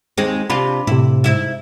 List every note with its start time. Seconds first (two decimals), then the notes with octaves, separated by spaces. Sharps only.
0.18 D#2 G#3 C4
0.50 C3 D4 F4 B5
0.87 A2 C3 E4
1.24 G#2 E4 E5